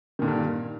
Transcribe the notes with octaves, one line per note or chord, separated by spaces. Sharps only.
G2 A#2 D3 D#3